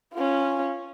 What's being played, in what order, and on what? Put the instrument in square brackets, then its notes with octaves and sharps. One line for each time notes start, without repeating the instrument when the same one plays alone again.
[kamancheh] C#4 F4